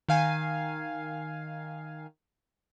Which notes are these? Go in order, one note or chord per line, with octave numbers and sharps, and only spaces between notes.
D#3 F5 G#5